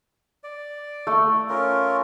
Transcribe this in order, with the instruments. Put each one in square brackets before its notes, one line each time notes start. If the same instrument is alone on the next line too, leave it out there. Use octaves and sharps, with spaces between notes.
[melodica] D5
[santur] A3
[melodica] C#4 F4 A#4